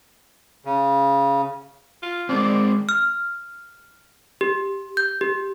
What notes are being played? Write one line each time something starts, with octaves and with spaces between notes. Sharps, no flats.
C#3
F4
G#3 C4 D5
F6
G4
G6
G4